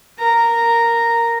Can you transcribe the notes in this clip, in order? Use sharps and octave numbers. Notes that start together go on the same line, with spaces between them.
A#4 A#5